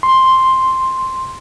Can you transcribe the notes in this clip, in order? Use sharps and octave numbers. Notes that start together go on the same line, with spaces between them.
C6